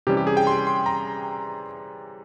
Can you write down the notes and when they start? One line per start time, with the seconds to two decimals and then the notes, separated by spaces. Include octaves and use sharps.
0.07 C3 E3 G3 C#4 G4
0.17 G4
0.27 G#4
0.37 G5
0.47 C6
0.67 C6
0.86 A#5